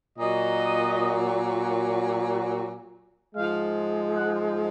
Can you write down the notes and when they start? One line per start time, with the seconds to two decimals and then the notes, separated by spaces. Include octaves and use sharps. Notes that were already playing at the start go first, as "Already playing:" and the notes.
0.19 A#2 F#3 D#5
3.35 G#2 F3 G#3 F5
4.15 F#5